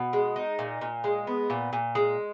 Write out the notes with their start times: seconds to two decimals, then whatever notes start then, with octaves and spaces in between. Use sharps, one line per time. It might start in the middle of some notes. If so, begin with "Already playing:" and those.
Already playing: B2
0.13 G#3
0.36 D#4
0.59 A#2
0.81 A#2
1.04 G#3
1.27 B3
1.50 A#2
1.73 A#2
1.95 G#3